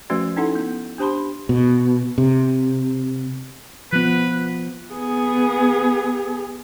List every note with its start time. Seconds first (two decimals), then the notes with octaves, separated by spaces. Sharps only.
0.10 F3 A3 C#4 F#4 B4 D5
0.37 C#4 D#4 E4 A4 F#5 C6
0.55 B3
0.98 D4 G4 C5 A5 B5 C6
1.49 B2
2.18 C3
3.93 F3 B3 B4
4.94 B3 G#4